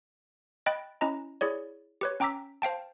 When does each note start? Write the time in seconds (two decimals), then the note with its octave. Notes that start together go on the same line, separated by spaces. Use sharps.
0.66 D#5 G5 B5 F#6 A6 D7
1.01 C#4 E4 D#5 A#5
1.41 E4 G#4 C#5 D5
2.01 G4 B4 C#5
2.20 C#4 G5 A#5 D6 E6 B6
2.62 C5 F5 G5 A5